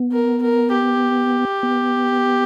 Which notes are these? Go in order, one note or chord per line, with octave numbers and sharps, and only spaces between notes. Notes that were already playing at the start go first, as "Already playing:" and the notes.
Already playing: B3
A#4
A#4
G4
B3